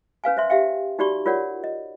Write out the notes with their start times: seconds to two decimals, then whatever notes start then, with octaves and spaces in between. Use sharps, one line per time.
0.24 C#4 B4 F5 G#5
0.37 C5 E5 C6
0.50 G4 E5 F5 G5
0.99 D#4 F#4 G4 D5 B5 C#6
1.26 F4 A#4 C#5 D5 F#5
1.64 D#5